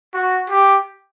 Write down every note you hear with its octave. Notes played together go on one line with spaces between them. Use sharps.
F#4
G4